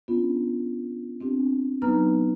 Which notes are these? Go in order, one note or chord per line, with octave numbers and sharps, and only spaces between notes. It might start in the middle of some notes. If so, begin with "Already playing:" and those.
B3 C#4 D4 F4
C4 D4 G4
F#3 B3 D#4 B4 A#5 F6